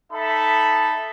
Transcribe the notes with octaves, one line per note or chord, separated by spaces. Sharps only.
D#4 A4 E5 A5 B5